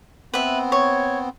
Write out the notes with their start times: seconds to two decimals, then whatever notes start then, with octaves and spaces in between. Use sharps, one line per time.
0.34 B3 C4 B4 E5
0.72 C#5